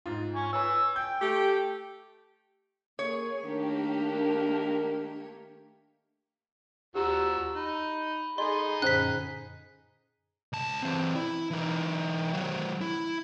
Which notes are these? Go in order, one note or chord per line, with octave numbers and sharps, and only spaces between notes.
G#2 F4
G#5 C#6
B4 C#5 G#5 E6
G5 G6
A3 G4
A#3 G#4 C#5
D#3 A3 A#3 D4 G4 A#4
D#2 F3 F#4 G4 A#5 E6
D#4 B5
D#4 G#4 A4 D#5 C6
F#2 A#2 D3 C#4 C5 B5 F#6 B6
C#2 A5
E3 C4
E4
E3 D#4
D#3 F#3
E4